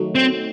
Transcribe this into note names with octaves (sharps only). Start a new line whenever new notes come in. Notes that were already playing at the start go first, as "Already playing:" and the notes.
Already playing: D#3 F#3 A3 D#4 F#4
C4